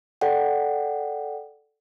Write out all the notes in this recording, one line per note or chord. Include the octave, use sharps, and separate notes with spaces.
A4 D5 F#5 G5